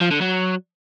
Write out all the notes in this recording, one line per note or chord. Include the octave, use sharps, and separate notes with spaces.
F3
D3
F#3